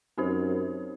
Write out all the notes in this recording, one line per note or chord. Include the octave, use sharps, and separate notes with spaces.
F#2 C4 D#4 G4 C5